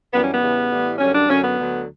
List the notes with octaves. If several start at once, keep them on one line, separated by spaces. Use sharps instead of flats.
F#2 E3 G3 B3
C#4
B3
E2 C#3 E3 G3
A2 E3 G3
F#2 D3 G3 C#4
D4
F#2 D3 F#3 C#4
B3
D2 D3 F#3